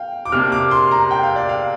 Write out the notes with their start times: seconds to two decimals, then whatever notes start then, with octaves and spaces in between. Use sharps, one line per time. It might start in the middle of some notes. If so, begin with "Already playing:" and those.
Already playing: F5 G5
0.25 D6
0.32 C3 A#3 D4 F6
0.52 D6
0.71 C6
0.91 A#5
1.11 G5
1.23 F5
1.36 D5
1.49 F5